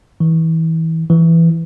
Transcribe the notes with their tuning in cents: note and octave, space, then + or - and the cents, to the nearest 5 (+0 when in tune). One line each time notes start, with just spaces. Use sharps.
E3 -30
E3 +5